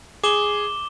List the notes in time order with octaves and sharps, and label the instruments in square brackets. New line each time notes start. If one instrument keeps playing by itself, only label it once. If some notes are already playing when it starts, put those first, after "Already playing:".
[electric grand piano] G#4 [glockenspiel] D6 E7 G7